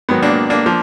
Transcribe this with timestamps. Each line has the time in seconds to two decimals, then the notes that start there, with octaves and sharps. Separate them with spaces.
0.09 G#2 D#3 F#3 B3
0.22 A#3 D4
0.50 A#3 D4
0.66 F3